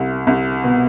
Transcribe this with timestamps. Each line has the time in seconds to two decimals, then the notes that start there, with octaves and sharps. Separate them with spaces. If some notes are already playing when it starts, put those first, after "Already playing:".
Already playing: C2
0.27 C2
0.64 B2